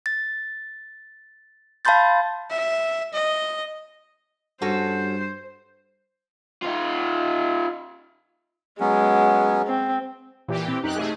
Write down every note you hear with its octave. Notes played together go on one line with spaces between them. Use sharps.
A6
F5 A5 B5 C6 G6 A6
E5
D#5
G2 C#4 F#4 A4 C5
D#4 F4
F#3 G#3 B3 C#4
C4
A#2 E3 G4
C4
F#2 D#4 G4 F#6
C3 A3 G#4